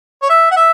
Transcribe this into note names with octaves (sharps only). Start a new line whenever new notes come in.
C#5
E5
F#5
E5